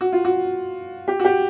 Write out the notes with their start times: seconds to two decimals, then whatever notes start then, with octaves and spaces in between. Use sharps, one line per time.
0.01 F#4
0.12 F4
0.25 F#4
1.08 G4
1.20 F#4
1.25 G4